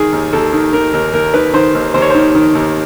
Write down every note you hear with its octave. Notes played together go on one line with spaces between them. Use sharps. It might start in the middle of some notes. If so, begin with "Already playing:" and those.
Already playing: D#3 G#4
D#2
D#2 A4
D#3
D#3 A#4
D#2 A#4
D#2 A#4
D#3 B4
D#3 C5
D#2
D#2 C5
C#5
D#3 C5
D#3
D#2